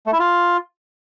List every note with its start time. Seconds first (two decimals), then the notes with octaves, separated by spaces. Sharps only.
0.06 A3
0.13 E4
0.19 F4